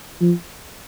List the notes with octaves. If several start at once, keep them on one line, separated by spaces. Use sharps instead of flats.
F3